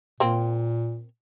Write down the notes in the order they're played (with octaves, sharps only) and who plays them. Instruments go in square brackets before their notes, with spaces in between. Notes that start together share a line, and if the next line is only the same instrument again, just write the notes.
[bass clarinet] A#2 [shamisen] A#3 C4